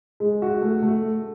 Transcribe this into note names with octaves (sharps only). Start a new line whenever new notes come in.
G#3
F#4
A3
A3